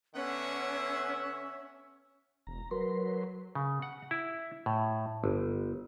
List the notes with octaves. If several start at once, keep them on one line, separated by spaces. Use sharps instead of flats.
D3 B3 C#4 E5 F#5
E1 A#5
F#3 A#4 B4 C6
C#3
F#5
E4
A2
G1